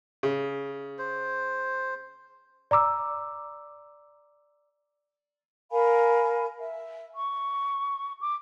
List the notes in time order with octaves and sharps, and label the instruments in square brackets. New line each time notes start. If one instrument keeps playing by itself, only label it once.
[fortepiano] C#3
[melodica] C5
[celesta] D5 A#5 D6 E6
[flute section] A#4 F5 G#5 B5
E5
C#6
D6